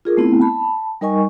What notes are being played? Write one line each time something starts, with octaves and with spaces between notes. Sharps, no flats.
F4 G#4 A#4
A3 B3 C4 E4
A5 B5
G3 D#4 A#4 D#5 G#5 C#6